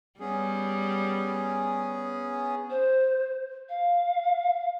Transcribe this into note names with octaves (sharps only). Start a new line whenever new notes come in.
G3 B3 C#4 G#4
C5
F5